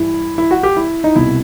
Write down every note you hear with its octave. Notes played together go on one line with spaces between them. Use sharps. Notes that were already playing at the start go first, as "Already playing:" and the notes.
Already playing: G2 E3 E4
E4
F#4
G4
E4
D#4
C2 B2 E4